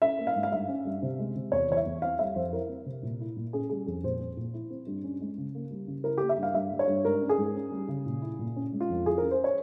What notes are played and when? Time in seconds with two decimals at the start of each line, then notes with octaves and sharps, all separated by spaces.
0.02 C#4 E5
0.18 A#3
0.27 F5
0.36 G#2
0.43 F5
0.52 G2 E5
0.69 C#4
0.85 G2
1.02 C3
1.19 G#3
1.36 C3
1.52 E2 C#5
1.70 E3 C#5
1.77 E5
1.86 E2
2.02 C4 F5
2.19 G3 E5
2.36 F2 C5
2.52 E4 A#4
2.69 C4
2.86 C3
3.03 A#2
3.20 E4
3.37 A#2
3.53 C#4 G#4
3.70 G3 G#4
3.87 F2 G#4
4.03 A#2 C5
4.20 C4
4.37 A#2
4.54 E4
4.70 C4
4.87 G2
5.04 C#4
5.20 G#3
5.38 C#3
5.55 A#3
5.71 G3
5.87 C#3
6.04 E4 A#4
6.18 A#3 G4
6.29 E5
6.37 G2
6.43 F5
6.54 G2 E5
6.71 G3
6.79 C#5
6.88 G2
7.05 G#2 A#4
7.22 C#4
7.29 G#4
7.38 G#2
7.55 C#4
7.72 G3
7.88 C#3
8.06 A#2
8.22 E4
8.39 A#2
8.56 C#4
8.72 G#3
8.80 F4
8.90 F2
9.06 E4 G#4
9.18 C#4 A#4
9.31 C5
9.44 C#5